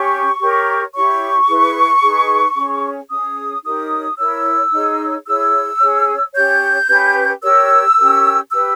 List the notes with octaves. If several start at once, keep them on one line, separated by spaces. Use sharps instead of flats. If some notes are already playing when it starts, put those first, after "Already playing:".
Already playing: C#4 G4 C#5 C#6
G4 A#4 C#5
E4 G4 C#5 C#6
E4 G#4 B4
D#4 G#4 B4
C#4 G#4 C#5
C#4 G#4 C#5 D#6
D#4 G4 A#4 C#5 D#6
E4 A#4 C#5 E6
D#4 G#4 C#5
E4 G#4 C#5 E6
C#4 G#4 C#5
C#4 G4 C#5 G6
C#4 G4 B4
G4 A#4 C#5 E6
C#4 G4 A#4
G4 B4 E6